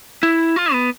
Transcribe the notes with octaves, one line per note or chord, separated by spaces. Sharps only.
E4
F4
B3